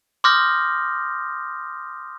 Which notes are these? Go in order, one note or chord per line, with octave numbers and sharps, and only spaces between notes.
C6 D6 D#6 F6 G6 A#6